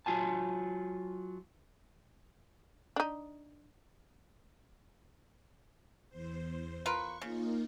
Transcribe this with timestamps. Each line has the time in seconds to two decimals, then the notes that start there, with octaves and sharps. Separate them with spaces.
0.06 F#3 F4 G#5 A5
2.96 D4 D#4
6.09 E2 C5
6.86 F4 A#4 B4 C#6
7.22 C#3 A#3 D#4 F4